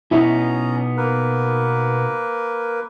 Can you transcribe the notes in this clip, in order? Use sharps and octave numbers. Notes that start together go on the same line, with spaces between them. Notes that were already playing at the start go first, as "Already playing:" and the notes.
B2 B3 C#4 D#4 E4 A#5
A#3 A#4 B4